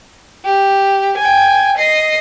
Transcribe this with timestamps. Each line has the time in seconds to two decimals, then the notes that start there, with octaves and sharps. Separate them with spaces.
0.45 G4
1.18 G5 G#5
1.78 D#5 C7